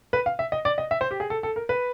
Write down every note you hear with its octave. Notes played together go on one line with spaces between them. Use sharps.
B4
F5
E5
D#5
D5
D#5
E5
C5
G4
G#4
A4
A4
A#4
B4